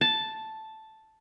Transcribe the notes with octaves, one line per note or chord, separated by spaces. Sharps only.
A5